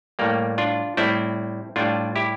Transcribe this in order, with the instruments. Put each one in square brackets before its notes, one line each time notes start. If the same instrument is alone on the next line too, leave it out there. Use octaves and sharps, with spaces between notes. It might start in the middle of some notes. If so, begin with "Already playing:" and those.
[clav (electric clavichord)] A2 G3 A#3
D4 F4
A2 G3 C4 E4
A2 G3 D4 F4
E4 G4